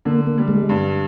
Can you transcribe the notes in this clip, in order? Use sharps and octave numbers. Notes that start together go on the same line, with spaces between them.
D3 A#3
A#3
G3
G#3
G2